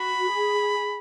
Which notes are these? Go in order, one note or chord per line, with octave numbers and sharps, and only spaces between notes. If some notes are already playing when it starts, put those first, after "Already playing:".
Already playing: F#4 B5
G#4